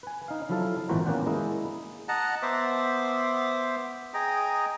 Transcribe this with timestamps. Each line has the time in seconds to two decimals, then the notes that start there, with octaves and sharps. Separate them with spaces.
0.03 B4 G#5
0.28 D#4 F5
0.49 F3 F#3 E4 A4 F5 A5
0.89 G#1 A#2 E3 F#4 C5 A#5
1.05 A#3 B3 C#4 D5 F#5 G5
1.26 G#3 A#3 E4 D#5
2.08 D#5 F#5 A5 A#5
2.42 B3 C5 E5 D6
4.14 G#4 D#5 G5 A#5